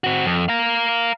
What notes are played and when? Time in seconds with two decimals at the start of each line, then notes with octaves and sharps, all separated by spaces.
0.04 C4 F#4
0.25 F2
0.49 F5 A#5